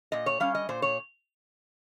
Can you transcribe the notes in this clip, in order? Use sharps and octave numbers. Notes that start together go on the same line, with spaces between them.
A#2 D#5
C#5
G3 C#4 F5
D#5
A#2 C5
C#5